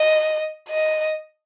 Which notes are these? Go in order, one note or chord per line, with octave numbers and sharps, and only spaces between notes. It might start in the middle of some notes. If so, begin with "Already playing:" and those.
Already playing: D#5
D#5